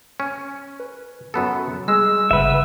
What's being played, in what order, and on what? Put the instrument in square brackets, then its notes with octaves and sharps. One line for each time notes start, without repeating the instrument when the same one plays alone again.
[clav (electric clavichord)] C#4
[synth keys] B4
[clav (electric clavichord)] F#2 B3 A4
[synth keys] G3 G#4 [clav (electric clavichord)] G#3 [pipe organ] E6
[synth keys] G1 C#3 F#5 [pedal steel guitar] B4 E5